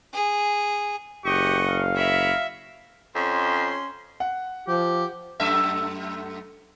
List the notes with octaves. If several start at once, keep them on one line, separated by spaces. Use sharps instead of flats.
G#4
F#1 G4 D#5 F#5 C#6
F5
A#4 C#5 E5 B5
F2 C#4 C6
F#5
F3 G4
F#2 A3 E5